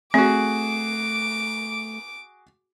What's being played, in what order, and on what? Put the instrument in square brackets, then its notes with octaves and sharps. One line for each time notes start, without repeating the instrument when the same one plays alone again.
[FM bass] A3 [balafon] C4 [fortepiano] F#4 G#4 [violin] D6